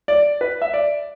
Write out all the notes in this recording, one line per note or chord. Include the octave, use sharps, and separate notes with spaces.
D5
B4
E5
D5